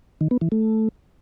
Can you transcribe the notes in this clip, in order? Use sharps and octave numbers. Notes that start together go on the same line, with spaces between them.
D#3
B3
E3
A3